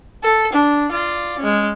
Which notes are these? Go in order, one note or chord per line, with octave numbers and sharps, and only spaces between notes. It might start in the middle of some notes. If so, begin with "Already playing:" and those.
A4
D4
F4 D5
G#3 C#4